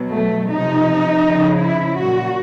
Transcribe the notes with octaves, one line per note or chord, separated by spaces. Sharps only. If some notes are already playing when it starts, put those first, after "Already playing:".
Already playing: B2 F#3
A3
C3 F3 D#4
C#3 F3
E4
A#2 F#3 F#4